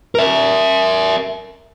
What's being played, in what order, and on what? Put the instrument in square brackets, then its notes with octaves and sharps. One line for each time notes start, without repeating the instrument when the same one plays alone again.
[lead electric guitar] A#4 E5